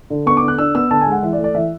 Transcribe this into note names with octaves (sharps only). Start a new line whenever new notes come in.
D3
B3 C#6
D6
D3
F#6
D4 E6
B3 E6
D3 A5
G#5
G#3
F#5
E3 E5
D5
A3
D5
E3 E5